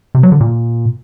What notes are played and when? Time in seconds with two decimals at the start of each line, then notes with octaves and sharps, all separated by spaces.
0.15 C3
0.23 F#3
0.32 D3
0.40 A#2